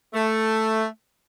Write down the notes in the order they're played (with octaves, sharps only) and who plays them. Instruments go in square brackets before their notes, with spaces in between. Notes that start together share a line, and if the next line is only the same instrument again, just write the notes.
[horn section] A3